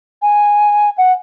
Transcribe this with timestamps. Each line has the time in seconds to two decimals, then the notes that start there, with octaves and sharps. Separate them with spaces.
0.22 G#5
0.98 F#5